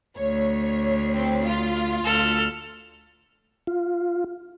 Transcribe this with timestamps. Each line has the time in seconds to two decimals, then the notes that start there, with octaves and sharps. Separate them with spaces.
0.18 D2 C#5
1.15 C4 C#5
1.45 F4
2.03 D2 A4 F6
3.67 F4